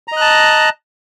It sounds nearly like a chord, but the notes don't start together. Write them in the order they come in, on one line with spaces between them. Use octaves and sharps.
A#5 D#5 F#6 A5